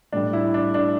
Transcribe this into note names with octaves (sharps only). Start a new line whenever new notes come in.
A2 G3 D4
E4
D4
D4